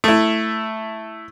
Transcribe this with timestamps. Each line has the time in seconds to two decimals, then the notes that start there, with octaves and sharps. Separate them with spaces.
0.04 A3 E4